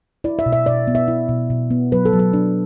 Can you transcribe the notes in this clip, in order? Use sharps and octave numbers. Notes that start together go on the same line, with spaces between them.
E4 D5
E5
B2
E5
B2 D5
B3
E5
E4
B2
B2
B3
F#3 B4
A4
F#3
A4
D4